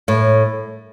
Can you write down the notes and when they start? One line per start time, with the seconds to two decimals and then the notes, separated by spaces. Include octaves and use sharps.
0.08 A2